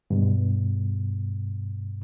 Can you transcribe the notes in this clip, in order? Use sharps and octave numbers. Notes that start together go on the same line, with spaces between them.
G2 B2